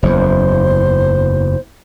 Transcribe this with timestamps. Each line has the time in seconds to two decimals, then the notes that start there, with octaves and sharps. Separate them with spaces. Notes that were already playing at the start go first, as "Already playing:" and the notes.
0.03 F#1 E2 C5